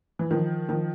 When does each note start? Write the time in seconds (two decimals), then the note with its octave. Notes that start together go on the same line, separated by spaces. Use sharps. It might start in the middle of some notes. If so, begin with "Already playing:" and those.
0.19 E3
0.31 D#3 F3
0.68 D#3 F3